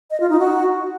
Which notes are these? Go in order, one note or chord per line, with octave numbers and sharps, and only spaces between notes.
D#5
F4
D#4
F#4